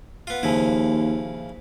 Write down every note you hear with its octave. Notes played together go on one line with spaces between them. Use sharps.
B3 F4
D#2 C#3 F3 E4